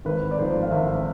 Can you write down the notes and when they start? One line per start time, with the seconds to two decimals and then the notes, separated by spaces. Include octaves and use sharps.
0.05 G#1 B4
0.31 D5
0.39 G#2 F3 C5
0.62 F5
0.71 G#1 E5